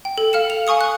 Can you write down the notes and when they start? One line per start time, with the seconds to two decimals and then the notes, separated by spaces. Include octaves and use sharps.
0.05 G5
0.18 A4
0.33 A4 F5 F6 C#7 E7
0.50 F7
0.67 F5 G#5 C#6 D#6 C#7
0.81 F#6